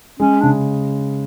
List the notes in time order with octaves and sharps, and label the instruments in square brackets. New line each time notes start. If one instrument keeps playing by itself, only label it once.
[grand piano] G#3 [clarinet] C#4
[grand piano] C#3 [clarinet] D4